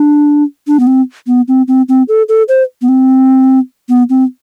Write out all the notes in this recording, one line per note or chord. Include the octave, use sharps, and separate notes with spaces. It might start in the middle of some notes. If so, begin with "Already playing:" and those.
Already playing: D4
D4
B3
C4
B3
C4
C4
C4
A4
A4
C5
B3
C4
B3
C4